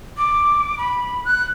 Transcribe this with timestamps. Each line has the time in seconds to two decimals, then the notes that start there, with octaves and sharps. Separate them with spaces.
0.18 D6
0.78 B5
1.25 F#6